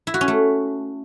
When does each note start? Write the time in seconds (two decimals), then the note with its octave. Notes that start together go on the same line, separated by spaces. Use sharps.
0.07 E4
0.14 F#4
0.21 C#4
0.28 A3